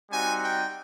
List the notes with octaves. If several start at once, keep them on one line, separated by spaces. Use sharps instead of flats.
G3 C4 D#4 F#4 G#5
G5